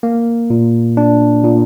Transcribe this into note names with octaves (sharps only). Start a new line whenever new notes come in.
A#3
A#2
D4
A#2